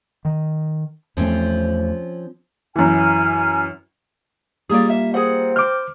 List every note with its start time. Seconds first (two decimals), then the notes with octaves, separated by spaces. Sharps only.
0.25 D#3
1.17 E2 F3 A3 C4 C#4
2.76 F#2 E3 G#5 F6
4.69 G3 A#3 F4 G#4 D5
4.90 E5
5.14 C4 G#4 A#4 F#5
5.56 C5 D6 F6